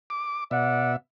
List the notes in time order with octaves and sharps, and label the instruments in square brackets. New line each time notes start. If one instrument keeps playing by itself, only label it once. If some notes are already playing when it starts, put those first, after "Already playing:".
[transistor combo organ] D6
[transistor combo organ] B2 E5 [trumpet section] D5 F#5